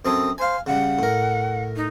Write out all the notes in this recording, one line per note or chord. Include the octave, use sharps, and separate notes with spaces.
F#2 C4 A4 D#6
C5 F5 G#5
C#3 G3 F#5
A2 A#4
D#4